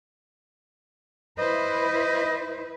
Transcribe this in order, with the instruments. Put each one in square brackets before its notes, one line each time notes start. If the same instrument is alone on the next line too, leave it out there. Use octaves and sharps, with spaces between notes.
[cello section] E4 B4 [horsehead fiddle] C5 [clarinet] D#5